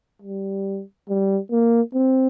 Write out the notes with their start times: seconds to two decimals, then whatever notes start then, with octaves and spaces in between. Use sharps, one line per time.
0.22 G3
1.09 G3
1.51 A#3
1.95 C4